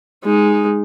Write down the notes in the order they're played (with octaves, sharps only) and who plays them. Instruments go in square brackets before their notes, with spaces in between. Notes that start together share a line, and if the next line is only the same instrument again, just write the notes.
[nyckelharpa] G#3 D#4